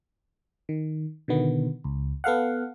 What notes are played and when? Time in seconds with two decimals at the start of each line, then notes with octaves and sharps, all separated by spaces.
0.69 D#3
1.28 B2 D3 D#3 B3
1.84 C#2
2.24 B3 A4 F5 F#5